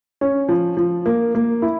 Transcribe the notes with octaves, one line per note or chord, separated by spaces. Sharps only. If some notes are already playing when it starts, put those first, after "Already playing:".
C#4
F3
F3
A#3
A#3
E4